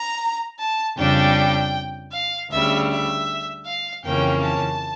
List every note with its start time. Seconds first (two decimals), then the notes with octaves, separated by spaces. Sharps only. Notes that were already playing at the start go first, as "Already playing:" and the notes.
Already playing: A#5
0.59 A5
0.97 F2 C#3 G3 D4 G5
2.13 F5
2.51 D2 C#3 G3 E5
2.90 E5
3.66 F5
4.04 F2 C#3 E3 A#3 C#4 G5
4.43 A5